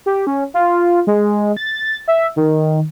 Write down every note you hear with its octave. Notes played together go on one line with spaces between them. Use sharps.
G4
C#4
F4
G#3
A6
E5
D#3